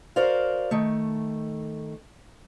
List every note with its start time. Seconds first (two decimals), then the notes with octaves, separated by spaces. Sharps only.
0.16 F#4 A#4 C5 D5 F5
0.71 D#3 A3